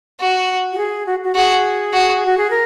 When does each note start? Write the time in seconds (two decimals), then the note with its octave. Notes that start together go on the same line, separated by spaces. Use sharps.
0.21 F#4
0.73 F#4
0.78 G#4
1.06 F#4
1.24 F#4
1.35 F#4 G#4
1.93 F#4
2.26 F#4
2.38 G#4
2.50 A#4